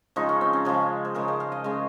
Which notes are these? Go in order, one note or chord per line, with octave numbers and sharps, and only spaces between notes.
C#3 F3 G#3 D#4
C#4
C4
C#4
C#3 F3 G#3 G#4
C5
C#3 G#3 A#4
C5
F5
D#5
C#3 G#3